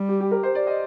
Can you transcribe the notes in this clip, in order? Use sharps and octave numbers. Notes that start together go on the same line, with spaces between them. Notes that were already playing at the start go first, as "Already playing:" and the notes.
Already playing: G3
G4
G4
A#4
C5
D5
D#5